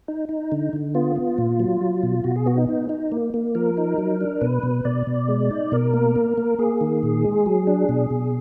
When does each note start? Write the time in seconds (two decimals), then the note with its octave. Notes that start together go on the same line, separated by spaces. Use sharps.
0.08 D#4
0.29 D#4
0.52 D3
0.73 D3
0.95 B3 F4
1.16 B3
1.38 A#2
1.60 F#3
1.81 F#3
2.03 B2
2.24 B2 F#4
2.36 G#4
2.46 B3 F#4
2.57 D#4
2.69 D#4
2.89 D#4
3.12 A#3
3.34 A#3
3.55 F3 A#4
3.77 D#4
3.98 F#3
4.21 D4
4.41 B2 B4
4.63 B2
4.85 B2 D5
5.07 B2
5.28 G#3
5.51 D#4
5.72 B2 A#4
5.94 A#3
6.16 A#3
6.38 A#3
6.59 A#3 G#4
6.81 D#3
7.03 A#2
7.24 G#3
7.46 F#3
7.67 D4
7.89 B2
8.10 B2